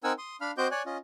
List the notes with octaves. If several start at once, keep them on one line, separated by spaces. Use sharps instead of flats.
C4 D#4 A#4 F#5 G#5 E6
C6 D#6
D4 F5 B5 F6
C4 F#4 C5 D#5 D6 G6
C#5 D5 G#5 F#6
C#4 F4 D#5